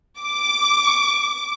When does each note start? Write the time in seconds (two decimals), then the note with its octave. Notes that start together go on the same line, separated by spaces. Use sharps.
0.19 D6